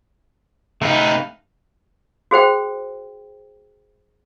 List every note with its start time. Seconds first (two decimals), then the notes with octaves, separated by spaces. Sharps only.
0.82 C3 A3 D#4 B4 F5
2.31 F#4 G#4 C5 G5